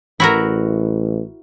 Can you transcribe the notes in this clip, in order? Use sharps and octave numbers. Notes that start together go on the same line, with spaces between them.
A1 E4 F#4 A#4